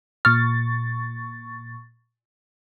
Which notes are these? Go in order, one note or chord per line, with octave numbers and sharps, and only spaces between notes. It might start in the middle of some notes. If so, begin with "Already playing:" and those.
A#2 C#6 F6 A6